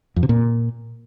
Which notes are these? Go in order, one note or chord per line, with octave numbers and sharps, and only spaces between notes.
F2
C3
A#2